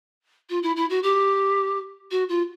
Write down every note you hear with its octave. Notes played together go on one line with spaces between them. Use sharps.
F4
E4
E4
F#4
G4
F#4
F4